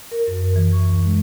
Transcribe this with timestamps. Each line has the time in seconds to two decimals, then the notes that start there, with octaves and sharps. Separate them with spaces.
0.11 A#4
0.27 F#2
0.43 A#4
0.56 E3
0.72 C#6
0.89 D2
1.05 G#3